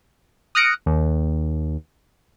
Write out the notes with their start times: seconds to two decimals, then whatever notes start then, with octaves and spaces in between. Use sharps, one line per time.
0.55 D#6 F6 F#6 A#6 C#7 D7
0.86 D#2